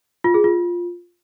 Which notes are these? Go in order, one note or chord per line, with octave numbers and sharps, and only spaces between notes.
F4
G#4
F4